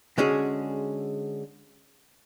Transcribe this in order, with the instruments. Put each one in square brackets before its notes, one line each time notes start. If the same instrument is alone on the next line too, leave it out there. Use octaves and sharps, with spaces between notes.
[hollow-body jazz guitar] D3 G#3 C#4 F#4 G#4